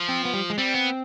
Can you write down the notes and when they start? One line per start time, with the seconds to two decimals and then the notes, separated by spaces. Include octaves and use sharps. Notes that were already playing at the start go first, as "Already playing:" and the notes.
Already playing: F3
0.09 C4
0.25 B3
0.33 G3
0.50 G#3
0.58 G3 C4
0.74 B3